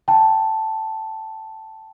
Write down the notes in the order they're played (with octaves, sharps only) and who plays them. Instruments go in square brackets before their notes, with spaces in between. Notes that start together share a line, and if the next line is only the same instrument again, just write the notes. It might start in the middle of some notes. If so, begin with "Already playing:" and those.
[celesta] G5 A5